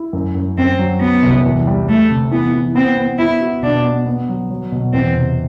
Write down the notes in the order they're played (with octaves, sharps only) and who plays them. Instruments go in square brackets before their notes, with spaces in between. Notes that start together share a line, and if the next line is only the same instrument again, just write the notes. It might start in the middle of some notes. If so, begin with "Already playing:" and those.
Already playing: [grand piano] E4
F#2
F#2
[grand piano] F#2 [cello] C4
[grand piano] F#3
[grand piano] F#3 [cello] B3
[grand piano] C2
E2
G3
[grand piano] G3 [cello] A3
[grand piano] C3
[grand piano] E3 [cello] B3
[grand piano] E3
[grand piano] B3 [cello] C4
[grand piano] B3
[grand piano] B3 [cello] E4
[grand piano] F#4
[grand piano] B2 [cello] D4
[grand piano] B3
B3
F#3
F#3
B2
[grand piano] E2 [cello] C4
[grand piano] C3